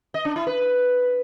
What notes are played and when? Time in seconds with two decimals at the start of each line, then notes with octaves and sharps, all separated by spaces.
0.14 D#5
0.25 D4
0.36 E4
0.47 B4